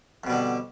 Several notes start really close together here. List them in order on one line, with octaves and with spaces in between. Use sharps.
F2 B2 G3 D3